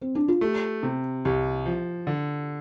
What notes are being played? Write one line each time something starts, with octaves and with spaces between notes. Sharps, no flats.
C4
D4
F4
A3 G4
C3
C2 G4
F3
D3